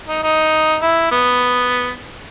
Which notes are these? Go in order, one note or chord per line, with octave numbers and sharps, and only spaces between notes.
D#4
D#4
E4
B3